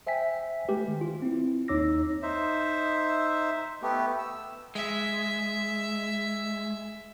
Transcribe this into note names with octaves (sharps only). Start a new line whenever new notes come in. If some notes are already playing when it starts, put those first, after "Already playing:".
C5 E5 G5 G#5 B6
G#3 A3 G4 B4
D#3
F4
C4 E4
D#2 D#4 C#5 D6 E6 A#6
D#4 C5 E5
A3 B3 G4
E6
G#3 E5